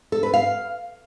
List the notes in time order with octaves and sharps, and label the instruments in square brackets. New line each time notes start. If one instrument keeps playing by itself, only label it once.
[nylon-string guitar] A4
B4
F5